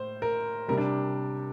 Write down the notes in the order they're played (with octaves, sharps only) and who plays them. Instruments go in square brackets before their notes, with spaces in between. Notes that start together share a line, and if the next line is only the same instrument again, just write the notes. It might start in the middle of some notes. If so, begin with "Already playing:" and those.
Already playing: [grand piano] A2 C5
A#4
C3 G3 A#4
D4